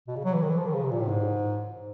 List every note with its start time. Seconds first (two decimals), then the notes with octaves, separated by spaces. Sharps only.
0.08 B2
0.16 C#3
0.24 F#3
0.33 E3
0.42 D#3
0.50 E3
0.58 F3
0.66 D#3
0.74 C#3
0.83 C3
0.91 A#2
0.99 A2
1.08 G#2